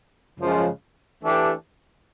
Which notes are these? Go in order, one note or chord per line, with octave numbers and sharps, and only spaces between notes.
F#2 C#3 F3 G#3 C#4
E3 A3 D4 G4